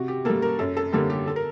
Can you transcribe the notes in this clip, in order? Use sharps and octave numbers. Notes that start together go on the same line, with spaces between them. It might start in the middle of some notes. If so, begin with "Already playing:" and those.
Already playing: C3 F#4
G4
G3 A#3 A4
A#4
F#2 A4
A4
D3 G3 A#3 A4
G4
A4
A#4